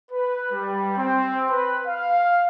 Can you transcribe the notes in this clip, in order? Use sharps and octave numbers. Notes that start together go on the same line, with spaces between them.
B4
G3
C4
B4
F5